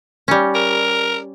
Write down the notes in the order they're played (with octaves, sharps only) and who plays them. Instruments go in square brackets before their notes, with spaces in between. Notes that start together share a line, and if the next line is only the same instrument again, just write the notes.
[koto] G3 C#4
[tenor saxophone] A#4